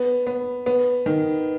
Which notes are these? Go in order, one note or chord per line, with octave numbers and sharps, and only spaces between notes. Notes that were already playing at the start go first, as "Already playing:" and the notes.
Already playing: B3
B3
B3
D#3